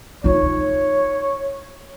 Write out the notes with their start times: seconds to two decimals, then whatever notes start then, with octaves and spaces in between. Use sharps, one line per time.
0.24 D#4 F4 C#5